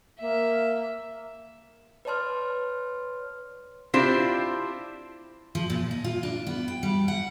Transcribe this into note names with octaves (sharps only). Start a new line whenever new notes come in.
A#3 E5
B4 C#5 D5 A5 C6 F6
C4 D4 E4 F4 G4 C5
F3
A#2
D#4
F4
D4
B3
G5
G3
F#5